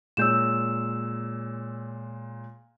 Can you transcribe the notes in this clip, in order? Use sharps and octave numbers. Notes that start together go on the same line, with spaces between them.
A#2 G#3 C#5 E6 G6 E7